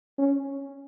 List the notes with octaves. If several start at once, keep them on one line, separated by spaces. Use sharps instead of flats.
C#4